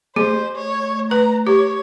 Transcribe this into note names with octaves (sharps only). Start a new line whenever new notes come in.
A3 G#4 C5
C#5
B4 A#5
G4 C#5